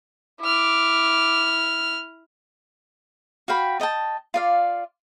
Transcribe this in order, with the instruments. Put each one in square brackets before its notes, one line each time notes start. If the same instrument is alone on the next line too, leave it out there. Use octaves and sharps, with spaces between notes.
[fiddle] E4 F6 [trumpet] D6
[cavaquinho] F#4 F5 G5 B5
D5 D#5 G5 A5
F4 D5 F5